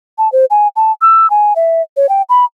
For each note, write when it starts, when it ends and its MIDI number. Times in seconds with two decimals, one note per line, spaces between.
0.18 0.31 81
0.32 0.45 72
0.50 0.68 80
0.76 0.92 81
1.02 1.29 88
1.30 1.54 80
1.56 1.82 76
1.97 2.09 73
2.09 2.22 79
2.29 2.45 83